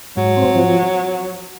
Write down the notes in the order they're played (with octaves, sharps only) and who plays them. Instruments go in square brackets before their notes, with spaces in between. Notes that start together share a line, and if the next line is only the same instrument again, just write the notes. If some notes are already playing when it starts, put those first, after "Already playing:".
[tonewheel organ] G#2 [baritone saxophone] F#3
[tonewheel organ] C4
F3